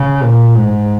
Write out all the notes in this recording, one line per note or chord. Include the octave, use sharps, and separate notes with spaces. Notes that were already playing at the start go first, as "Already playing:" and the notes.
Already playing: C#3
A#2
G#2